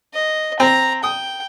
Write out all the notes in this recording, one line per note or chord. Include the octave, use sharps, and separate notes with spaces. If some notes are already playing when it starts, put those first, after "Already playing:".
D#5
C4 A#5
G5 D#6